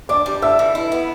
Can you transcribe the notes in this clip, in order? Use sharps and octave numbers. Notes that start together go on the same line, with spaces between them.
D4 D5 D6
G3
A4 E5 E6
E3
E4
B3